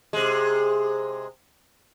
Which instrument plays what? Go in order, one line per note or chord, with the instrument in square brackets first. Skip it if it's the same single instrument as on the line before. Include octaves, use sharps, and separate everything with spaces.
[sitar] C3 G#3